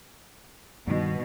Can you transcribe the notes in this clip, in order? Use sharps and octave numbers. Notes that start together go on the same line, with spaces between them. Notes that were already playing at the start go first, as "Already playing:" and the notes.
G2 B2 D#3